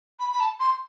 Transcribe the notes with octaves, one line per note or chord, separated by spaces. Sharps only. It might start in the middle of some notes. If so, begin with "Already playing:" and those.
B5
B5
A5
C6